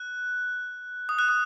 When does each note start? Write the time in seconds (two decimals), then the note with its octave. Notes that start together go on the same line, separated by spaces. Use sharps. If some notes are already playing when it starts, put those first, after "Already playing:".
Already playing: F#6
1.09 D#6
1.19 F#6
1.29 D#6